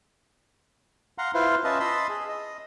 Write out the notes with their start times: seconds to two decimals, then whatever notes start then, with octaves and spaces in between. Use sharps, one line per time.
1.18 F5 F#5 A#5 C6
1.34 E4 F4 B4 C5 F5
1.64 C#4 F4 B4 D#5 E5 A5
1.80 D#5 A5 B5 C6 E6
2.09 G#4
2.29 D#5